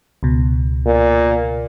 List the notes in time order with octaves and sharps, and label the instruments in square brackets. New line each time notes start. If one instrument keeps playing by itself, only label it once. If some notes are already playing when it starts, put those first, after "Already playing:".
[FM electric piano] C#2 B2
[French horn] A#2